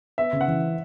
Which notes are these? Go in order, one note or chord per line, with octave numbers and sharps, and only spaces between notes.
B3 E5
C#3
F#5
E3